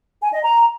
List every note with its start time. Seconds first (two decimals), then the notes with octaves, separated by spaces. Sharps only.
0.21 G#5
0.32 D#5
0.44 A#5